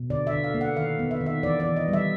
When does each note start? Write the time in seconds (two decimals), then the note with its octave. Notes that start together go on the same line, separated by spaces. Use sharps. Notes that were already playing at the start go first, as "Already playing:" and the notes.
Already playing: B2
0.10 D3 D5
0.27 E5
0.33 D3
0.44 F5
0.54 A#3
0.61 F#5
0.76 D#3 F5
0.99 B3
1.11 E5
1.21 D#3
1.26 E5
1.43 E3 D5
1.60 D5
1.65 E3
1.76 D#5
1.88 G3
1.93 E5